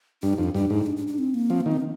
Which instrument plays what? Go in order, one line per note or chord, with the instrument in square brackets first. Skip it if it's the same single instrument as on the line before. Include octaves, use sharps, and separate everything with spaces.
[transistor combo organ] G2 [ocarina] D4
[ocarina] D#4
[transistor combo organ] F2 [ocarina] D4
[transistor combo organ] G2 [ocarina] D4
[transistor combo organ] G#2 [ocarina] D#4
[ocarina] D4
D4
D4
C4
A#3
[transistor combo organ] F3 [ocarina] C4
[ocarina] A#3
[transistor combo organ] D#3
[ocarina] C4